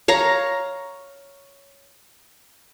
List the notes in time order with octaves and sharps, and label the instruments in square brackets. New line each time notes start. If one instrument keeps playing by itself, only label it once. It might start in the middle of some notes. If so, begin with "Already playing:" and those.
[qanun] C#5 F5 A#5